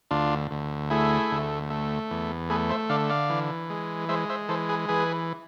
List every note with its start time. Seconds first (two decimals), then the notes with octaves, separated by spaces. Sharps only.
0.11 D2 D4 F4
0.51 D2
0.90 A3 E4 G#4
1.31 D2
1.70 A3
2.11 E2
2.50 A3 G#4 B4
2.69 C5 E5
2.89 D3 D5 F5
3.10 D5 F5
3.30 E3
3.70 G#3
4.09 G#3 C5 E5
4.30 C5 E5
4.49 E3 A4 C5
4.69 G#4 B4
4.89 E3 G#4 B4